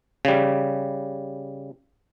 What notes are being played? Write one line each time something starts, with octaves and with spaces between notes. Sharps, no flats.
C#3 G3